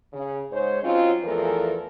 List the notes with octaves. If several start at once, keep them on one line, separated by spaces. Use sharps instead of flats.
C#3
G#2 C5 C#5
F#3 C4 C#4 D#4 F4
E2 E3 F3 A3 A4 A#4